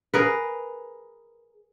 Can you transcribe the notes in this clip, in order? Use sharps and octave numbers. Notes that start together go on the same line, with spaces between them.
G#4 A#4 B4